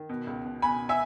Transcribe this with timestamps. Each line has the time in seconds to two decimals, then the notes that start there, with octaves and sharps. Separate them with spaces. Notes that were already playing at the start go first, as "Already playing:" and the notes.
Already playing: D#3
0.09 B2
0.27 C#2
0.45 B2
0.62 B2 G#5 B5
0.89 E5 G#5